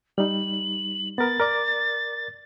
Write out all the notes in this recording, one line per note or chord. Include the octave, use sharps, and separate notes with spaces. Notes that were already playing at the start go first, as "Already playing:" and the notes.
G3 D#4 F#7
B3 A#4 A6
A#4 D5 D6